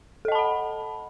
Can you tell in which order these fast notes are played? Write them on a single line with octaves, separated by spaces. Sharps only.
A4 D#5 A5 B5 F#5